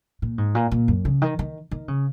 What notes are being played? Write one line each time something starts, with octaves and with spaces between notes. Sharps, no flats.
A#2
G#2
A#2
A#2
F#2
C#3
D#3
D#3
D#3
C#3